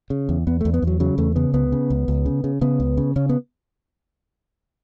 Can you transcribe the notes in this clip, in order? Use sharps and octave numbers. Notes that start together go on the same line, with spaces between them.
C#3
E2
E2 B3
E2 A3
B3
E2 F#3
C#3 F#3
E2 A3
C#3 B3
C#2 B3
C#3
C#2
C#2
C#3
C#3
C#3 B3
C#2
C#3
C#3 C#4
B3